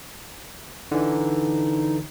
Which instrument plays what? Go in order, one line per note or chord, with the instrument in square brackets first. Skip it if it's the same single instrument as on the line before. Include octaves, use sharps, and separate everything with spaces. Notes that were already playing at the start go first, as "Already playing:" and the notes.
[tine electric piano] D3 E3 [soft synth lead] D#4